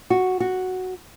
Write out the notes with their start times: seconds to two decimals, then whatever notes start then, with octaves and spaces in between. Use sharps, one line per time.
0.10 F#4
0.40 F#4